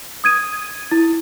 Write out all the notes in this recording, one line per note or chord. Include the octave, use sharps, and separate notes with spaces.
D#6 G#6 D#7
E4